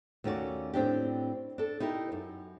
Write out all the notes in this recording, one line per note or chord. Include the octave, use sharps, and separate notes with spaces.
D#2 A3 C#4 F#4 D5
A2 C4 D4 G4
D4 A4
D#4 E4 G4 A#4
F#2